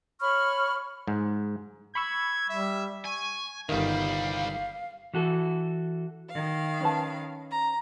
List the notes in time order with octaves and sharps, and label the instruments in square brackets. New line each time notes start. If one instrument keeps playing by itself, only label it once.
[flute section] C#5 B5 C#6 F6
[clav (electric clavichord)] G#2
[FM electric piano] B5 C#6 E6 [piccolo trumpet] G#6
[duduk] G3 [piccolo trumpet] E5
[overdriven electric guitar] G#5 [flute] C#6
[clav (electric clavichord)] G1 D#3 [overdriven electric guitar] C2 G3 [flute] F5
[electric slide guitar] E3 F#4 A4
[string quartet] D#3 F5
[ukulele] C#4 B4 A5
[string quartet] A#5